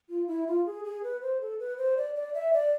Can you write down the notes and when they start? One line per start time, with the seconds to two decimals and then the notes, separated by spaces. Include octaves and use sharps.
0.09 F4
0.28 E4
0.47 F4
0.66 G#4
0.84 G#4
1.03 B4
1.22 C5
1.41 A4
1.59 B4
1.78 C5
1.97 D5
2.15 D5
2.34 E5
2.53 D5